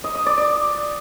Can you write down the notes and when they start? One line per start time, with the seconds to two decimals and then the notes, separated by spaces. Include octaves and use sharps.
0.04 D#5
0.15 D#5
0.26 D5
0.37 D5